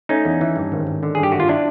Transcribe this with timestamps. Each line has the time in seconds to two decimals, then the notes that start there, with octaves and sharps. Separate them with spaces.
0.09 A3 C#4 D#4
0.25 E2
0.41 E3
0.56 G2
0.72 G#1
0.87 G#1
1.03 D3
1.15 G2 G#4
1.23 G4
1.32 G#1 F#4
1.40 F4
1.49 D4 E4